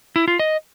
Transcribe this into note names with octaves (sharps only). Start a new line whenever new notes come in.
E4
F4
D#5